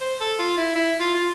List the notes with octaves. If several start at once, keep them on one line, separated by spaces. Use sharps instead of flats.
C5
A4
F4
E4
E4
F4
F4